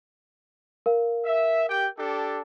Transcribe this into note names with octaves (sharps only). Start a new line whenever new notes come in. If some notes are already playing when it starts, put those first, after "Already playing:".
A#4 F5
E5
G4 G5
D4 G4 A4